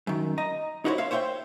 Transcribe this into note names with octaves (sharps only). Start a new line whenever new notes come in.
F#2 D#3
D#5 A#5
D#4 E4 F#4 A4 C5 C#5
C#5 E5 F5
C5 C#5 E5 F#5 G5